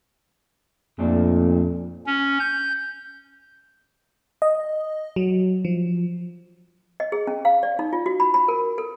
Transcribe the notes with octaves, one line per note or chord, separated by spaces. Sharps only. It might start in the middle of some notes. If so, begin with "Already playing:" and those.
F2 A#2 A3 D4
C#4
G6
D#5
F#3
F3
D#5
G#4
C#4
F5
D5
D#4
F4
F#4
B5
B5
A#4
A4